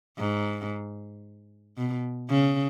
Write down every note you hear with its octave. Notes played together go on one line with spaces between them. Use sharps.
G#2
B2
C#3